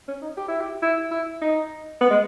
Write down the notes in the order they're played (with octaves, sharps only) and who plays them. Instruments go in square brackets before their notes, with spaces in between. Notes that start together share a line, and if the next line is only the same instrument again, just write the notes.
[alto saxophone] C#4
D#4
G4
E4
G4
E4
E4
D#4
B3
G#3